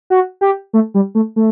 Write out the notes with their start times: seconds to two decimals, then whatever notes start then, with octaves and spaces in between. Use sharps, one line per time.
0.10 F#4
0.41 G4
0.73 A3
0.94 G3
1.15 A3
1.36 A3